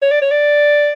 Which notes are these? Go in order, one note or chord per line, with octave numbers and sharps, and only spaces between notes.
C#5
D5
C#5
D5